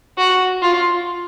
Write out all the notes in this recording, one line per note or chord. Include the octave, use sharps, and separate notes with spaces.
F#4
F4